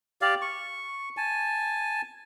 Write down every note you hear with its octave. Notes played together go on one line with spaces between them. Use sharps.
G4 D5 F5
C#6
G#5 A5